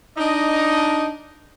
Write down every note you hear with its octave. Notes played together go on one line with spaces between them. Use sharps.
D4 D#4 D#5